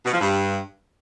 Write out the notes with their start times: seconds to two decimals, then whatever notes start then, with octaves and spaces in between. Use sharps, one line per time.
0.06 B2
0.13 F3
0.21 G2